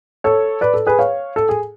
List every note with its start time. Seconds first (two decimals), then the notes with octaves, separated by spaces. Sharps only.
0.24 A4 C#5
0.61 B4 D5
0.74 A4
0.87 G#4 B4
0.99 C#5 F5
1.36 A4
1.49 G#4